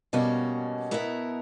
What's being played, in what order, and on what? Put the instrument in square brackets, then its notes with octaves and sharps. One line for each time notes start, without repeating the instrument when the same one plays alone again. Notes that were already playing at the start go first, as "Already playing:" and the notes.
[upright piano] B2 [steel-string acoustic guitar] G3 A#3 C#4 F#4
[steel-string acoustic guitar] B3 E4 A#4 E5